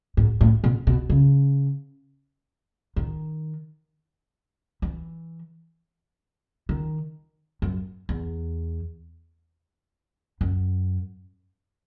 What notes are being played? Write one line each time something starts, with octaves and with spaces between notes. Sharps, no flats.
G#2
A2
B2
B2
C#3
D#3
E3
D#3
F#2
E2
F#2